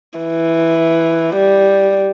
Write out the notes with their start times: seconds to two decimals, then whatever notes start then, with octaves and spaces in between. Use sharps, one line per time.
0.20 E3
1.36 G3